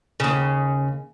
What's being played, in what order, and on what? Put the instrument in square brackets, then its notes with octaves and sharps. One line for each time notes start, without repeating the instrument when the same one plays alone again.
[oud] D#2 C#3